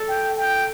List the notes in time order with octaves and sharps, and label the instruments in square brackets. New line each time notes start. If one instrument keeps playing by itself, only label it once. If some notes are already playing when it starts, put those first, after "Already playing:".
Already playing: [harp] A4
[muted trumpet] G5
G5